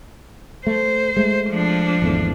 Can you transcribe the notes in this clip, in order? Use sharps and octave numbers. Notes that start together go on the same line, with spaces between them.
A3 C5
G#3 A3
F3 D4
G#1 E2 A3